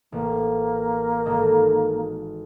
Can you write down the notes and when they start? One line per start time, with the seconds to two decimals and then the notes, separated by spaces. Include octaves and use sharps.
0.12 A1 A#3
1.26 G#1 A4 D#5